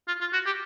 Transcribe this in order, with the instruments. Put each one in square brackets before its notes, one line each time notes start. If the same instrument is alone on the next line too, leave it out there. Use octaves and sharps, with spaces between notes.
[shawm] F4
F4
F#4
G4